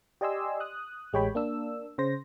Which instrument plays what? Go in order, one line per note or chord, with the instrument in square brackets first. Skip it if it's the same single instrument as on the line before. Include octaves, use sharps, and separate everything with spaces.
[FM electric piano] G4 D5 D#5 G#5 C6 E6
D#6 F#6
A1 G#3 G4 C#5 G5 B5
A#3 D4 E6
C#3 C5 A#6